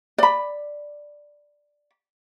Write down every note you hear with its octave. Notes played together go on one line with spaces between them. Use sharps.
D5 B5